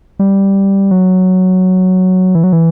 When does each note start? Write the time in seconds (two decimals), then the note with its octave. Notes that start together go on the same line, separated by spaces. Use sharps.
0.19 G3
0.91 F#3
2.35 E3
2.44 F#3
2.53 E3